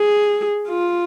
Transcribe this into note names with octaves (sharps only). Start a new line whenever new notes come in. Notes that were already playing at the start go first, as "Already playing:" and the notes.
Already playing: G#4
F4